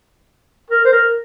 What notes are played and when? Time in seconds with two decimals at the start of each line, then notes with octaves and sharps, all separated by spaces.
0.70 A#4
0.85 C5
0.92 A#4